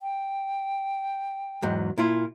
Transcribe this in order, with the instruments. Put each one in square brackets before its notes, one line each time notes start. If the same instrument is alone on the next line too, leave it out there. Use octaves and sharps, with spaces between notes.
[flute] G5
[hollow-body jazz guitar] E2 G#2 F#3
A#2 E4 F4